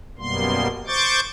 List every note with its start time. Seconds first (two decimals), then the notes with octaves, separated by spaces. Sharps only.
0.18 F#2 B2 G3 A#3 B3 C6
0.87 C5 C#6 D6 G6 A6